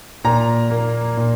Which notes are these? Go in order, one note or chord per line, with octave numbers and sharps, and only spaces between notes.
A#2 A#5
A#3
A#2